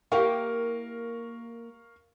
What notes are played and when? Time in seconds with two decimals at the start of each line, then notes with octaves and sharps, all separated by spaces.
0.12 A#3 E4 G4 A#4 F5 C#6